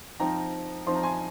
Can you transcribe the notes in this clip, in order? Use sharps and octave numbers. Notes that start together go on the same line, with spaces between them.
F3 C4 D#4 G5 A#5
F3 C4 D#4 C6
A#5
G#5 C6